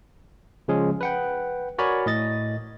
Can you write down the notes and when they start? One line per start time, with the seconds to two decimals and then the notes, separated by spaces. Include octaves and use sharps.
0.68 C#3 F3 G#3 C#4 G#4
1.01 B4 F#5 G5
1.78 F#4 A#4 C#5 D5 G#5 B5
2.06 A2 D#5 A6